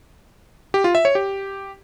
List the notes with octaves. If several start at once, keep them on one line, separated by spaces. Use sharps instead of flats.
G4
F4
E5
C#5
G4